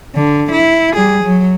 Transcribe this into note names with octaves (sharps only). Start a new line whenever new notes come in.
D3
E4
G3 G#4
F#3